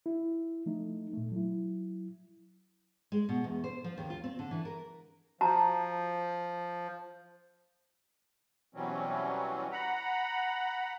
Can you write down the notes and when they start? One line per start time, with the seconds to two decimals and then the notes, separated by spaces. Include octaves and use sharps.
0.06 E4
0.66 F3 A3 D#4
1.13 A#2 A3
1.32 F#3 E4
3.12 G#3
3.29 B2
3.44 E2
3.64 C5
3.84 F3
3.98 D#2
4.10 F4
4.24 C4
4.39 D3
4.51 E3
4.65 A#4
5.41 F3 F#4 A5 A#5
8.75 B2 E3 F#3 G3 C4 C#4
9.72 F#5 A#5 B5